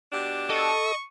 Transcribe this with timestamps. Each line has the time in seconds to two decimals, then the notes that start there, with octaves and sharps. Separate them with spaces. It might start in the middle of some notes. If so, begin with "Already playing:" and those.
0.12 B2 D4 G4
0.50 A4 D#5 C#6